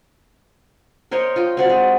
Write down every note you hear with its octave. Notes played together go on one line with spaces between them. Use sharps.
A#4 C5 C#5 D#5
F4 D#5 G5
C4 F#4 D5
G#3